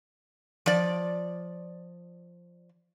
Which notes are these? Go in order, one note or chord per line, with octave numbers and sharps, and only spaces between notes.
F3 D5